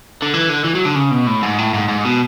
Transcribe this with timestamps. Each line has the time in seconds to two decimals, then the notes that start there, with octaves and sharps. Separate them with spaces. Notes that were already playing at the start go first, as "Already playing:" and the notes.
0.22 D3
0.34 E3
0.49 D3
0.64 E3
0.75 F#3
0.85 D3
0.95 C#3
1.11 B2
1.27 A2
1.43 G#2
1.58 A2
1.74 G#2
1.89 G#2
2.05 B2